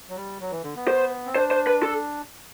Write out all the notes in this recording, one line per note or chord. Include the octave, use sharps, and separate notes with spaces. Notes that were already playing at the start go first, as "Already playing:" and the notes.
F#3
G3
F#3
E3
D3
B3
C5
C4
D4 C5
C5
B4
A4